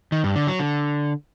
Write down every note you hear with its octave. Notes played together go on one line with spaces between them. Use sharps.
D#3
G2
D3
F#3
D3